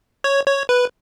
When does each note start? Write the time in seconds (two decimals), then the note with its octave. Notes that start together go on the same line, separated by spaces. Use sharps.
0.24 C#5
0.46 C#5
0.69 B4